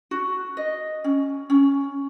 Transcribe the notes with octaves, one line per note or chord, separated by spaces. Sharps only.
F#4
D#5
C#4
C#4